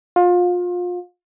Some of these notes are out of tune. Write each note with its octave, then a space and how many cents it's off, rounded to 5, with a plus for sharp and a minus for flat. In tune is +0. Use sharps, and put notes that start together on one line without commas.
F4 +30